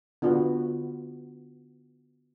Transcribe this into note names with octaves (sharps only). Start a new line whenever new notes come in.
D3 B3 F4 F#4